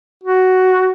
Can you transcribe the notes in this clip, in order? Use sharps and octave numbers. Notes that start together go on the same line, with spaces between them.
F#4